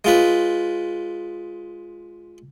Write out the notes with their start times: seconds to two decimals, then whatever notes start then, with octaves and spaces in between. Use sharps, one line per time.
0.05 G#3 F4 B4